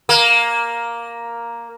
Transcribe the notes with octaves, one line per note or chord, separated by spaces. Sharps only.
A#3